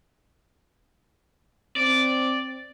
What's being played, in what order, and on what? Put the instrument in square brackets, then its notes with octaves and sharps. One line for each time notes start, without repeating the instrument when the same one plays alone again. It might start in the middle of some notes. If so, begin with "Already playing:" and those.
[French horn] C4 [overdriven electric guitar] D5